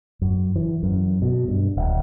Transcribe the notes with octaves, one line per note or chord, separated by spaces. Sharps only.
F#2
E3
F#2
B2
G2
D1